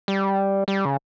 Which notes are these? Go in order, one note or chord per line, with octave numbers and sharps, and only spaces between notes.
G3
G3
C#3